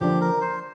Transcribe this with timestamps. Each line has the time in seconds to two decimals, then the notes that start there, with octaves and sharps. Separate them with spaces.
0.01 D3 F3 A#3 D4 G4
0.21 A#4
0.41 C5